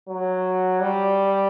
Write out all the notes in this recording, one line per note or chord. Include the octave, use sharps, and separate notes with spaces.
F#3
G3